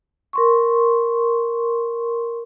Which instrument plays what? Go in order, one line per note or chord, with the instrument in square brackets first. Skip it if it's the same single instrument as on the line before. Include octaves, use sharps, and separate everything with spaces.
[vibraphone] A#4 C6 C#6